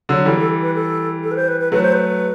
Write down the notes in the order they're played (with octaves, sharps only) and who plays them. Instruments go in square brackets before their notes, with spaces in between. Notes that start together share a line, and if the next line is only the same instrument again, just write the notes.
[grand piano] D3 F#3
[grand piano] E3 G3 [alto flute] A4
[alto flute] A4
B4
A4
A4
B4
C5
B4
B4
[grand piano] F#3 A3 [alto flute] B4
[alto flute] C5
B4